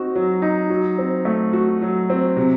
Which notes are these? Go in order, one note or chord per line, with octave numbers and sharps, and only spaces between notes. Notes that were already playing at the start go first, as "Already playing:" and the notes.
Already playing: C4 D#4 F#4
F#3
D#4
F#3
C4
A3
F#4
F#3
C4
C3